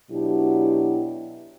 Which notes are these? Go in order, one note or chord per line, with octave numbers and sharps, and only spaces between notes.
B2 F#3 D4 E4 G4